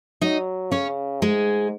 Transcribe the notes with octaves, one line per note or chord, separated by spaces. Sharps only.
F#3 D#4 D#5
C#3 C#4 C#5
G#2 G#3 G#4